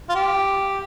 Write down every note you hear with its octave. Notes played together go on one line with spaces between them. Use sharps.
F4
G4